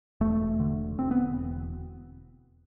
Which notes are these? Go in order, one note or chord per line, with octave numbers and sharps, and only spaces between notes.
E1 A3
D3
E1 C4
B3